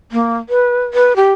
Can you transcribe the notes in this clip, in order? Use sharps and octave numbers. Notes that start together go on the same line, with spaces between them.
A#3
B4
B4
G4